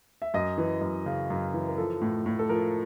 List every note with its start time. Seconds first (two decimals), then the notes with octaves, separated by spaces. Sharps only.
0.22 E5
0.34 F#2 D#5
0.58 E3
0.81 F#2
1.06 C#3
1.30 F#2
1.54 E3
1.68 A#4
1.78 F3 A4
2.02 A2
2.26 A2
2.39 A4
2.49 F3 A#4